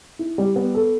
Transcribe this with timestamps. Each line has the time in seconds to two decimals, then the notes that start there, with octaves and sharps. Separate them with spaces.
0.19 E4
0.38 G3
0.56 B3
0.74 A4